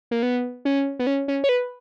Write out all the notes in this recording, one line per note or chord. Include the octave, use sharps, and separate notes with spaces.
A#3
B3
C#4
B3
C#4
C#4
C#5
B4